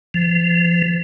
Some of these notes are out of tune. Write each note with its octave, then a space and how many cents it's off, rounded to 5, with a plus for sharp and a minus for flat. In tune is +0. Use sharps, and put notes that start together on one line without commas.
F3 -30